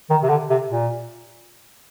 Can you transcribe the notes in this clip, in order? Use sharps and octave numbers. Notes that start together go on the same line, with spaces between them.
D#3
C3
D3
C3
A#2